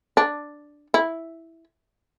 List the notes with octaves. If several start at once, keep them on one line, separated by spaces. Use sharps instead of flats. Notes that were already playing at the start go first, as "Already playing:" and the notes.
D4
E4